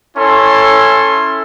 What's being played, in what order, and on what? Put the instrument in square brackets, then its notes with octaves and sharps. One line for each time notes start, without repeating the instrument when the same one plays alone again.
[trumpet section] C#4 E4 A4 C6